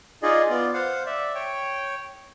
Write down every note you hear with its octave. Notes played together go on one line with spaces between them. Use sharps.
D#4 F4 G#4 D5 D#5
B3 F4 D5
C5 F5 F#5
D5 E5
C#5 G5